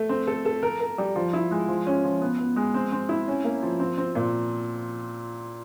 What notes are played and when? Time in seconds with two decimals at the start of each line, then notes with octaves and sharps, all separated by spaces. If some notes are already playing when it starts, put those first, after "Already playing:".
Already playing: A3
0.09 C4
0.27 A4
0.45 A4
0.63 A#4
0.80 A#4
0.98 G3
1.15 F3
1.33 E4
1.51 G#3
1.68 F3
1.87 C#4
2.04 F3
2.21 B3
2.39 B3
2.56 G#3
2.74 C4
2.92 C4
3.09 E4
3.28 C#4
3.44 A#3
3.62 F3
3.80 C4
3.98 C4
4.15 A#2